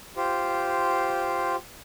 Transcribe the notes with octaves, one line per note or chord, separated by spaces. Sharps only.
F4 G4 C5